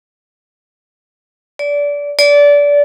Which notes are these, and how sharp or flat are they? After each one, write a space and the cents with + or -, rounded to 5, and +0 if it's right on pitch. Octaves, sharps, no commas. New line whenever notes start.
D5 -25
D5 -25